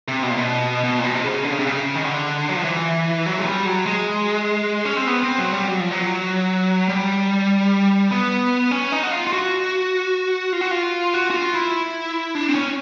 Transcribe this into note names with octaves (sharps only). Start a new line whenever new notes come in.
C3
B2
A#2
B2
B2
A#2
B2
C3
C#3
D3
C#3
C3
C#3
D#3
D3
F#3
F3
E3
F#3
G#3
G3
F#3
G#3
C#4
C4
B3
C4
F#3
G3
F#3
F3
F#3
G3
B3
C#4
D#4
F#4
F4
F4
F#4
F4
F#4
F4
F#4
F#4
F4
E4
D4
C4
C#4